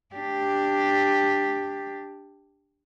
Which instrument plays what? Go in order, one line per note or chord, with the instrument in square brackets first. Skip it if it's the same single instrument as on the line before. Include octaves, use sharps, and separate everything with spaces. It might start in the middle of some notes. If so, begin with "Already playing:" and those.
[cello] D4 G4